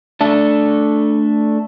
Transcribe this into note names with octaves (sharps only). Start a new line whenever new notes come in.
A3 D4 A4